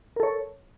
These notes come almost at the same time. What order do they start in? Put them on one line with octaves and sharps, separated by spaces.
A#4 A4 C#5